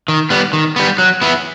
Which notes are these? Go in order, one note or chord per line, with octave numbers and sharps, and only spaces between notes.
D#3
G3 B3
D#3
G3 B3
F#3
B3 E4